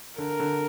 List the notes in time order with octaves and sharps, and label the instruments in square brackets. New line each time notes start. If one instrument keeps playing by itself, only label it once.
[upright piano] D3 [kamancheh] A#4
[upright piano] D3